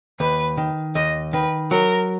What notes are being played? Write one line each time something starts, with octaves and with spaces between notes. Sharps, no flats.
D#2 B4
D#3
D#2 D#5
D#3 B4
F#3 A#4